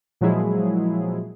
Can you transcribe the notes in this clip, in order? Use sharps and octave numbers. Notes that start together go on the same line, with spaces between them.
A#2 F3 F#3 G#3 E4 G#4